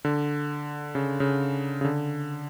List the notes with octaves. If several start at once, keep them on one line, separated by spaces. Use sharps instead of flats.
D3
C#3
C#3
C#3
D3